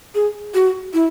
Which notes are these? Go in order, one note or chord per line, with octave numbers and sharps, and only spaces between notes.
G#4
F#4
E4